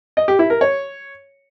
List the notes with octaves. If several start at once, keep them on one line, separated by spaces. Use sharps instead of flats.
D#5
G4
E4
A#4
C#5